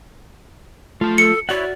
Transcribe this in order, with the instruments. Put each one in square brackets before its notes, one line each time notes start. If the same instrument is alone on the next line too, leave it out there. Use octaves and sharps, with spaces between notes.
[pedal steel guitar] A3 [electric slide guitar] F4 A5
[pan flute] A4 [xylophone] C#7
[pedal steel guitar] E4 C#5 F#5 [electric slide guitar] F#4 E5 [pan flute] D5